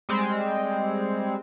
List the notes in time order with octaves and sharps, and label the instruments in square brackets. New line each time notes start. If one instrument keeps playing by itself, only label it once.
[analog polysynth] G3 G#3 C4